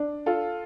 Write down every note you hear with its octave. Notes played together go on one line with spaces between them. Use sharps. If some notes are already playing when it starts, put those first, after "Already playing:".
Already playing: D4
F4 A4